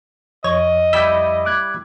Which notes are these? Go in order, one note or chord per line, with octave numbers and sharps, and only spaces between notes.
F2 C#5 D#5
G3 E4 E5 E6 G6 B6
D6 F#6 G#6